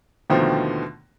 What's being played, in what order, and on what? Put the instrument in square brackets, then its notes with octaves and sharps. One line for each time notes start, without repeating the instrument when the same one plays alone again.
[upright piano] D#2 B2 D3 D#3 F3 A3